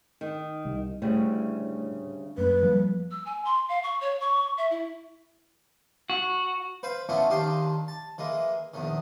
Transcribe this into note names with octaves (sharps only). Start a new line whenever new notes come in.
D#3
C2
D2 A2 C#3 G3
F#2 A#3 B4
F3 G3 A#3
E6
G#5
C6
F5
C#6
C#5
C#6
E5
E4
F#4
B4 C5 F5
A3 B3 C#4 D4 E4 F4
D#2 D#3 D4 G4 F5 C6
A5
E3 G#3 A#3
A#1 E2 D#3